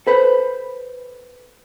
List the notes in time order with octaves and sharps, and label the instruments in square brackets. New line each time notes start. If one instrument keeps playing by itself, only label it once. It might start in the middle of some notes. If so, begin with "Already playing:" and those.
[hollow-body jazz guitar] A4 B4 C5